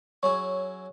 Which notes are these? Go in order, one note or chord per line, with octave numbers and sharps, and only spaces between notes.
F#3 C#4 E4 G#4 C#5 C#6